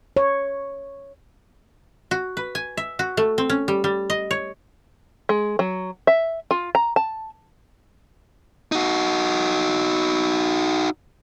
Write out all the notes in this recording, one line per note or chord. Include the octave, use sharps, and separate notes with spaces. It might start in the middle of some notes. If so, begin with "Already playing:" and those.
C#5
F#4
B4
G#5
E5
F#4
A3
C4
C#4
G3
G3
D#5
C#5
G#3
F#3
E5
F4
A#5
A5
D#4 F#4